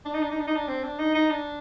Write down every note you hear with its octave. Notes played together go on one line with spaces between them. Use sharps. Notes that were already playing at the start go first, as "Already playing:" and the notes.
D4
D#4
D4
D#4
D4
D#4
D4
C4
D4
D#4
D#4
D4